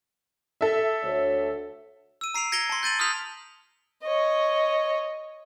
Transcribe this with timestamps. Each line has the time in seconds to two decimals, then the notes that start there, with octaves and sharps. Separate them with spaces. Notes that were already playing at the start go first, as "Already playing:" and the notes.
0.61 A4 E5
1.03 D2 C#5
2.21 E6 D#7
2.34 A#5 C7 D7 F7
2.52 G#6 A#6 C#7 D7 F7 G7
2.70 A5 C6
2.83 G6 A6 D#7 F#7
2.99 D#6 F6 G6 B6 F7
4.03 C#5 D#5